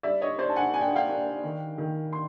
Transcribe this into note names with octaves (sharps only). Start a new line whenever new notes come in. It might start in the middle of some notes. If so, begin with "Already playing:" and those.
G3 D5 E5
C#5 D#5
D4 C5 D5
A5
F#5 G#5
D4 G#5
G5
F#5
F5 G5
D4
D#3
D#3
C6